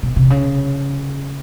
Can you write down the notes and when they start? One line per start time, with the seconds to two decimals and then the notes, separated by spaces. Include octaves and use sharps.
0.03 B2
0.16 C3
0.30 C#3